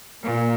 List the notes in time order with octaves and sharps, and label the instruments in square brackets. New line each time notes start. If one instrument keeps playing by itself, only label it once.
[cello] A#2 [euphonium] A#3